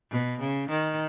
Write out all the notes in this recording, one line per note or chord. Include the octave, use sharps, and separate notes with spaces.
B2
C#3
D#3